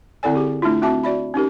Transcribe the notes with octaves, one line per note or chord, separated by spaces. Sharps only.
D3 C4 E4 A4 D5 G#5
G4 G#4
A3 D4 E4 F4
C4 F#4 E5 A5 D6
F#4 D5 E5 B5
C#4 D#4 G4 A#4